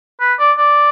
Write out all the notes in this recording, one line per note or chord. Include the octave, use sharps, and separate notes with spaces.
B4
D5
D5